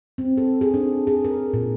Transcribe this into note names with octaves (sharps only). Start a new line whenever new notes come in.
C4
A4
G#4
D4
G#4
A#4
A#2